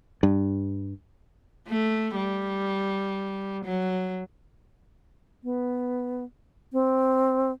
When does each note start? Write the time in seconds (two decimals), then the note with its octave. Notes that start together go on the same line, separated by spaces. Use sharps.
0.23 G2
1.68 A3
2.16 G3
3.65 F#3
5.44 B3
6.73 C4